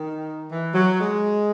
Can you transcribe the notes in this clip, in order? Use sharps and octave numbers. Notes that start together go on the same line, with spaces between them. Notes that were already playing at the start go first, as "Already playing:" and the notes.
Already playing: D#3
E3
F#3
G#3